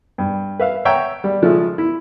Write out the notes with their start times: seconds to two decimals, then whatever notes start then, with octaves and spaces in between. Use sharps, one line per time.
0.18 G2
0.59 B4 E5 F5
0.85 C#5 E5 F#5 G5 A#5
1.24 G3
1.42 C#3 F3 G#3 A3 E5
1.78 E4